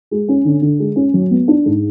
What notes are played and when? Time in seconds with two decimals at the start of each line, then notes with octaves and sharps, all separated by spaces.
0.11 G#3
0.29 C#4
0.45 D3
0.62 D3
0.79 G#3
0.96 C#4
1.14 F#3
1.31 B3
1.48 D4
1.66 G#2